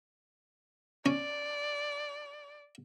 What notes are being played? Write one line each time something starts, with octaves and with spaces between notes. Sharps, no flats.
C#4 D5